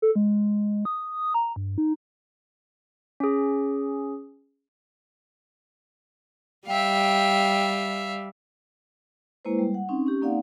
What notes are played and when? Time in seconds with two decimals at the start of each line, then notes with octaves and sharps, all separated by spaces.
0.02 A4
0.16 G#3
0.85 D#6
1.34 A#5
1.56 G2
1.78 D#4
3.20 C#4 G#4
6.68 G3 E5 F5 G5
9.45 G#3 A#3 E4 B4 C5
9.59 G3
9.74 F#5
9.89 C4 C#4 D#4
10.06 C#4 G4
10.21 A#3 C4 D#4 D5 F5 F#5